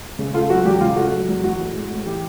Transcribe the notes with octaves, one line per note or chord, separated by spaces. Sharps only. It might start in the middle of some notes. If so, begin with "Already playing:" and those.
C#3
A3 F4
F#3 F#4
E2 G4
C#3 F4
A3 F#4
F#3
E2
E3 F#4
A2
G#3
A2
E3 G4